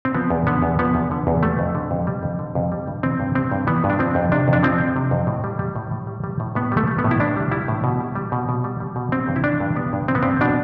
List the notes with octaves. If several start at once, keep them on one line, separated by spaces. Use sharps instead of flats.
C4
F3 B3
E2
D3 B3
E2
F3 B3
E2
D3
E2
G3 A3
F2
D3
F2
G3
F2
D3
F2
G3
G2
E3 C4
G2
G3 C4
G2
E3 B3
G2
D4
F3 C4
F2
C3 D4
F2
D4
F3 C4
F2
C3
F2
A2
G3
G3
A2
A2
G3
G3
A2
A2 B3
G3
A3
G3
B3
A2
E4
A2 D4
G3
G3 E4
A2
B2
G3
G3
B2
B2
G3
G3
B2
G3 C4
G2
E4
E3 D4
G2
G3 B3
G2
E3 C4
B3
G2 C4
B2 D4